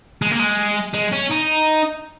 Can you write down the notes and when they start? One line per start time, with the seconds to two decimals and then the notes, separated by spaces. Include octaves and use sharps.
0.22 G#3
0.31 A#3
0.40 G#3
0.93 G#3
1.12 C#4
1.30 D#4